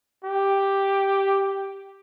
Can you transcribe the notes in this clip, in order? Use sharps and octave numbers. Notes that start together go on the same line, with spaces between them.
G4